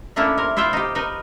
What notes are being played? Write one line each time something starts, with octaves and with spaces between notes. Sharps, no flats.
A3 A#3 C#4 D4 E4
C3 A#4
E4 F4 C5 E5 G5
D#4 G4
D#4 A#4 B4